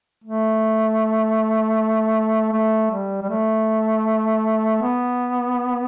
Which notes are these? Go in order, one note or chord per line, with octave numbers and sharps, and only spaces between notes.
A3
A3
G3
G3
A3
B3